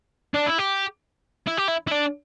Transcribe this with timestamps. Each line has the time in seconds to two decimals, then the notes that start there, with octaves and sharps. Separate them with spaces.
0.34 D4
0.46 E4
0.58 G4
1.47 E4
1.57 G4
1.68 E4
1.87 E4
1.91 D4